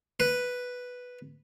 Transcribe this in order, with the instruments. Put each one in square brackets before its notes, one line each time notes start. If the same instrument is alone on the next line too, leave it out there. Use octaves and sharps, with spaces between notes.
[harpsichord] B4